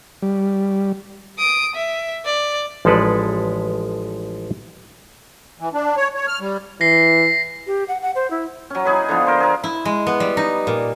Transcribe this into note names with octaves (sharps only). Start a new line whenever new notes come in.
G3
D#6 D7
E5
D5
A1 F3 G#3 A4 B4 D5
E3
D4
C#5
C#5
F6
G3
E3 A#6 C7
G4
F#5
F#5
C5
E4
F#3 C#4
D#4 E4 G#4 B4
D3 F3 B3
A#4 C5
G#4 A#4
E4
G#3
B3
G3
D#4
A#2